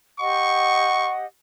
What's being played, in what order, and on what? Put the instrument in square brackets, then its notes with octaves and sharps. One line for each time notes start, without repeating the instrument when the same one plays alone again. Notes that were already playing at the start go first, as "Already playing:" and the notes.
[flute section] G4 D#5 F#5 [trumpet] C#6